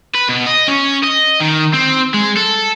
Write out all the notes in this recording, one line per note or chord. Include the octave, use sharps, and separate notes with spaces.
B4
B2
D#5
C#4
D#5
D#3
C4
G#3
A4